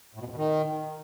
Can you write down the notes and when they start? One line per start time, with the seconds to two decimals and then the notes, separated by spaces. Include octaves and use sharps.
0.15 A2
0.20 B2
0.26 F2
0.31 B2
0.37 D#3